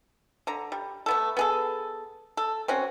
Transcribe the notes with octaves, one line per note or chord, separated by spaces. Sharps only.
D3 A#5
G3
A3 B3 A4
B3 G#4 A4
A4
C4 C#4 F#4